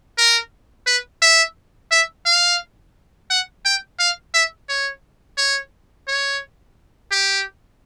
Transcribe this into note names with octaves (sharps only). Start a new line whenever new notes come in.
A#4
B4
E5
E5
F5
F#5
G5
F5
E5
C#5
C#5
C#5
G4